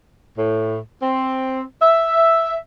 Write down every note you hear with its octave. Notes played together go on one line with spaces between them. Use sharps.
A2
C4
E5